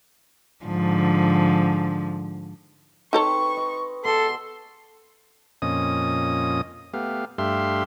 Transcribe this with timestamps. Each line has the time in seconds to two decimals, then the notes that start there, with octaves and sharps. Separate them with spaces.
0.65 G#2 D3 F3
3.13 C4 D#4 A4 B4 C#5 C#6
3.57 D#5
4.05 B2 G#4 A4 C6 D6
5.62 F2 A#2 C#4 D#5 D#6
6.94 A3 B3 G4 F5
7.38 G2 A3 G4 E5 F5 C6